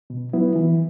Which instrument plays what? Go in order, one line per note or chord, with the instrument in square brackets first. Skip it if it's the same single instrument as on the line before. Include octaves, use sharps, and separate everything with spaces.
[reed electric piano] B2
F#3 B3 E4
E3